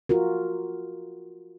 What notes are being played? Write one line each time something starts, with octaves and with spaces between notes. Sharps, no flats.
F4 F#4 A#4